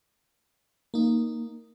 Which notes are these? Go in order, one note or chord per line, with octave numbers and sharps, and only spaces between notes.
A#3 D#4